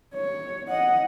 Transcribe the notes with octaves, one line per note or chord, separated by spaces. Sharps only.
C#5
D#5 F#5